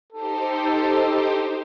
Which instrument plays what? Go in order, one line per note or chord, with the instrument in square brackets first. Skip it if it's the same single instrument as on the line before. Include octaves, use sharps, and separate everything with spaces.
[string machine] D#4 G4 C5 [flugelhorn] A4